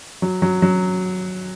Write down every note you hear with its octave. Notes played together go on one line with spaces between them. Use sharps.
F#3
F#3
F#3